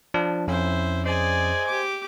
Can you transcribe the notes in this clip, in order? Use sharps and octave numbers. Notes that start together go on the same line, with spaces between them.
F3 D4
F2 C#4 E4 C5
G#4 C5 D5 D#5 G#5
G4 D6